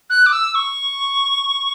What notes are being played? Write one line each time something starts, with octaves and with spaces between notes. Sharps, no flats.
F#6
D6
E6
C#6